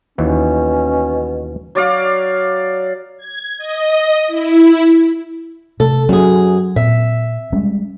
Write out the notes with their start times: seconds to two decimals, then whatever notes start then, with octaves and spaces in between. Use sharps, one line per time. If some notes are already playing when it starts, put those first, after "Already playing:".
0.18 D#2 B2 E3 C#4
1.75 F#3 D5 F5
3.17 G#6
3.58 D#5
4.27 E4
5.80 C3 A3 A4
6.09 F#2 F#3 C#4 G#4
6.76 A#2 C4 E5
7.52 G3 G#3 C#4